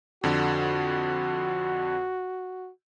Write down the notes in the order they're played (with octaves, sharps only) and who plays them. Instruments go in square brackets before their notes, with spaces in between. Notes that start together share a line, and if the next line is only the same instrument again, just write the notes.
[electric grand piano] F2 D3 [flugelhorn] F#4